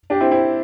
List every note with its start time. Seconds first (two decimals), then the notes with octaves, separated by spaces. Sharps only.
0.10 D4 G4
0.20 C4 E4
0.31 C4 E4